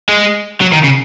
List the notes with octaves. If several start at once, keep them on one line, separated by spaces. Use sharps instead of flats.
G#3
F#3
D#3
C#3